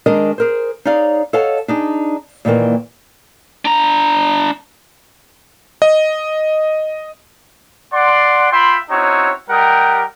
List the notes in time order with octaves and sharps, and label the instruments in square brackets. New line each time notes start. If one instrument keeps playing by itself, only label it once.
[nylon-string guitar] D#3 G#3 D4 G#4 A#4 D#5
G#4 A#4 C5
D#4 G#4 C#5 D5 F5
A4 C#5 D#5 F5 F#5 A5
D4 D#4 G#4
A#2 D#3 E3 A3 A#3
[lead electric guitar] D4 A#5
[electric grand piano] D#5
[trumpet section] D5 F#5 C6
F4 E5 G5 B5 C6
C4 C#4 D#4 E4 F#4 C#5
G3 G4 A#4 D#5 F#5 G5